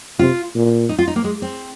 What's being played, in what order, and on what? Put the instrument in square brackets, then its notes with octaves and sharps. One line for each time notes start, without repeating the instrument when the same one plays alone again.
[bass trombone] C3 [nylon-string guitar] F4
[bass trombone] A#2
[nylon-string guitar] D#4
F4
D#4
A#3
G#3
C4